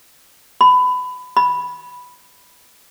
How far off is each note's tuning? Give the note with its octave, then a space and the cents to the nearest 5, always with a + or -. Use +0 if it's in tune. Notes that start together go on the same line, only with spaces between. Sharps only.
B5 +20
B5 -5